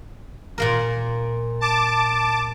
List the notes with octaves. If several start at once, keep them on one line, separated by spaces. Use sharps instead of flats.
A#2 A#3 A#4
A5 D6